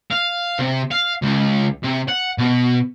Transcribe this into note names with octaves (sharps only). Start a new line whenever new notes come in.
F5
C3
F5
C#2
C3
F#5
B2